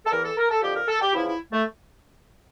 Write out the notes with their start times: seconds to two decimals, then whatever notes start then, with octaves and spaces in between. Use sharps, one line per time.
0.06 A4
0.12 E2 E3 A#4
0.24 A4
0.37 A#4
0.50 A4
0.62 F2 D3 F3 G4
0.75 A#4
0.88 A4
1.02 G4
1.14 E2 C#3 F3 E4
1.27 E4
1.52 A3